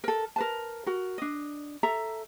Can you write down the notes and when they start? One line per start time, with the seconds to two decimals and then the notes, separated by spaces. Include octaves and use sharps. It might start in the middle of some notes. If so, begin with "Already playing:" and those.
0.04 A4 A#4
0.36 A#4 B4 A5
0.86 F#4 A#4
1.18 D4 D#5
1.83 A4 E5 A#5